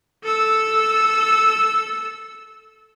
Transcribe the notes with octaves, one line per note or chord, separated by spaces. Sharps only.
A4 E6